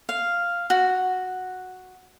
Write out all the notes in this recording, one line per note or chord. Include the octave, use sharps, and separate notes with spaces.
F5
F#4